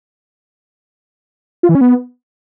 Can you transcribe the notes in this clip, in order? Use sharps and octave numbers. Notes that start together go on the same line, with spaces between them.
F4
E3
C#4
B3